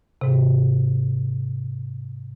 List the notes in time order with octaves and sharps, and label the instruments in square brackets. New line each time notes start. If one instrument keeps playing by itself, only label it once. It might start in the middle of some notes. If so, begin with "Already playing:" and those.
[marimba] G#2 C3